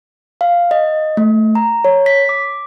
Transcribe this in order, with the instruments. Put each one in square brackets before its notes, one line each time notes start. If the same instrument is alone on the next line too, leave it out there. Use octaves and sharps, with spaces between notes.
[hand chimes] F5
D#5
A3
A#5
C#5
B6
D6